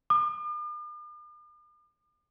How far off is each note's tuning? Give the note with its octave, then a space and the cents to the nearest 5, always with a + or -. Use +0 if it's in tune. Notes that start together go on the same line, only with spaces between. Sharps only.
D6 +45